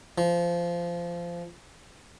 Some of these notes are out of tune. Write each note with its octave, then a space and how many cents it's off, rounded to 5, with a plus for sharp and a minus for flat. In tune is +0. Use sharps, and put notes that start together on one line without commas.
F3 -20